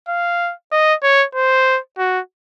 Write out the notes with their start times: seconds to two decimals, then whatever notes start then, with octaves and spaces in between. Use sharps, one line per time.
0.09 F5
0.72 D#5
1.03 C#5
1.35 C5
1.98 F#4